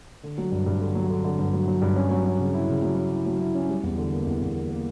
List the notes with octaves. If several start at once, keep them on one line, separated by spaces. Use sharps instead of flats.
D3
F#3
G2
G2
D3
F#3
D3
D3
G2
F#3
F#3
G2
C#4
F#3
C#4
C#3
E4
C#3
F#3
C#4
E4
F#3
E4
C#4
G3
E2
D3
A#3
E2
E2
A#3
A#3